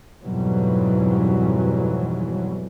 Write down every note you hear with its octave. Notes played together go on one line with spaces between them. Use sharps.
F2 G#2 B2 E3 F#3 G3